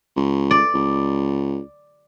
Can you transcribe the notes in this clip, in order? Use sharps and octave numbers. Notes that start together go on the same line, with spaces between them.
C#2
D5
C#2